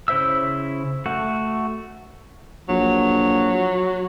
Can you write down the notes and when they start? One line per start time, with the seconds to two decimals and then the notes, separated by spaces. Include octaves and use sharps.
0.08 C#3 E4 C5 E5 E6
1.06 A3 F#4
2.69 A#1 F#3